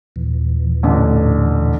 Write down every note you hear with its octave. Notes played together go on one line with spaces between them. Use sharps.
D#2 A#2 E3
A1 D3